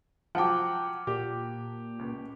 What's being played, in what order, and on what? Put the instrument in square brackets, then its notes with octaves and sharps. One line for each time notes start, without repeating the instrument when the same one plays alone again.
[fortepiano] F3 F#3 [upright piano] F#5 G5 [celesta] A5 D6
[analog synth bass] A#2 [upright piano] G4
[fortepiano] C#2